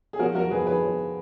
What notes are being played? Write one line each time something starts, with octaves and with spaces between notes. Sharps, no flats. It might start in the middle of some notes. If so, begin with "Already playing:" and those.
G#4
F3 F#4 A#4
F2 F#4 A#4
F2 G#4 B4
F3 G#4 B4
F3